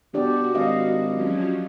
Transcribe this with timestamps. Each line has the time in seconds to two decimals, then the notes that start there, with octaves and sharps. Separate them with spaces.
0.14 B2 D4 F#4 G4 D5
0.55 G#1 D#5 F5
1.09 F3 F#3 C#4